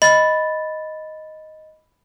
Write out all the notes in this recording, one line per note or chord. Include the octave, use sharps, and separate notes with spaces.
D#5 B5 A6